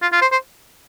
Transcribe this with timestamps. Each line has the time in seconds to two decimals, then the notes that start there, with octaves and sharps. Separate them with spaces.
0.02 F4
0.13 F4
0.22 C5
0.32 C5